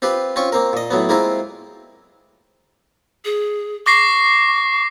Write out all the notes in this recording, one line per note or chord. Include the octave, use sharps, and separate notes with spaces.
C4 F4 G4 B4
C4 C#4 F4 C#6
A#3 C4 A#4
A#2 D#5
A2 F#3 B3
G#3 A#3 C4 E4 F4 A#4
G#4
C#6 D6 A#6 C7